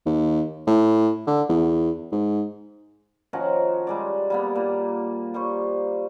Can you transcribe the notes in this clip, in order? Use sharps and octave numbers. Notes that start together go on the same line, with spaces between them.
D#2
A2
D3
E2
G#2
D#3 F3 C#4 F#4
G3 G#3 D5
G3 A#3 B3
A#2
G3 C5 C#6